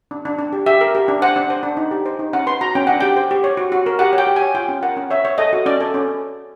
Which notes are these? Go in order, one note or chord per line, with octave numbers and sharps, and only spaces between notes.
D4
D4
D4
G4
G4 E5
A#4
G4
D4
C5 F#5
D4
C5
D4
D#4
G4
C5
D#4
C#4 F#5
B4 C6
F#4 A#5
C#4 G5
D4 F#5
G4 G5
C5
G4
C#5
F#4
F#4
A#4
G4 F#5
C#5
G5
G4
G#5
C#5
F4 G5
C#4
A#4 F#5
C#4
C#5 E5
C#5
A4 D#5
F#4
C#4 D5
A4
C#4